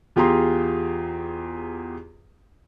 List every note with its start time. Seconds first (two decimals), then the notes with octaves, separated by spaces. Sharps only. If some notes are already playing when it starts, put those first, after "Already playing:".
0.16 E2 F4 G4 G#4 A#5 C6